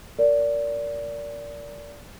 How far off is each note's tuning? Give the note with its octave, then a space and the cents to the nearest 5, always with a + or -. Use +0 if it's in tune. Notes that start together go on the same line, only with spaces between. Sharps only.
A#4 -10 D5 -20